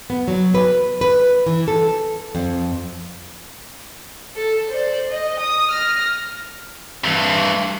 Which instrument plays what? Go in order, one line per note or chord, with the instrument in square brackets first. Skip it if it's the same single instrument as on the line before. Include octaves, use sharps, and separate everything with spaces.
[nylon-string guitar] B3
F#3
B4
B4
E3
A4
F2
[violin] A4
C5 D5
D#5
D#6
F6 A#6
[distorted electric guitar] G2 E3